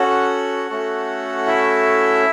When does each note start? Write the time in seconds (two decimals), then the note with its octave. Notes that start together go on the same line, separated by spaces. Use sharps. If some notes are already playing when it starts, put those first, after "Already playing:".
Already playing: C#4 F#4 A4 F#5
0.69 A3 C#4 F#4 A4
1.47 E4 E5